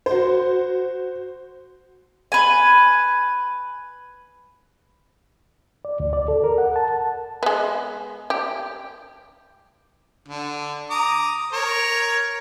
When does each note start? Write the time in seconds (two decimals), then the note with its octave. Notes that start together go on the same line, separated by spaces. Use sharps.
0.06 F#4 C5
2.32 B4 G#5
5.85 D5
6.00 D2
6.13 D5
6.28 A4
6.44 A#4
6.58 F#5
6.76 A5
7.43 G#3 B3
8.30 G4
10.28 D3
10.90 A#5 D6 D#6
11.52 A#4 C#5